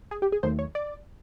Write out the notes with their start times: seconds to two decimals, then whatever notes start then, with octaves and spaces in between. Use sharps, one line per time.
0.11 G#4
0.22 G4
0.32 G#4
0.43 D#2 D#3 F#3 A3 C5
0.59 C#5
0.75 D5